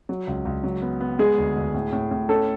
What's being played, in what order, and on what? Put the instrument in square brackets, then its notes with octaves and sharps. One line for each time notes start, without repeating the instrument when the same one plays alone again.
[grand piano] F#3
C#2
C#2
F#3
B3
B3
[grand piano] G#3 [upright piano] G#4
[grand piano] D2
D2
A2
A2
A2
[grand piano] C#4 [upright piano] A4